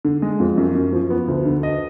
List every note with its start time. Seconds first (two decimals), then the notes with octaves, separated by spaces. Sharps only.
0.05 D3
0.22 G#3
0.40 F2
0.58 F#2
0.75 F#2
0.93 F3
1.10 B3
1.28 D2
1.45 D3
1.63 D#5